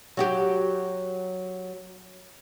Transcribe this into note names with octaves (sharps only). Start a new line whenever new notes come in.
F#3 F#4 G4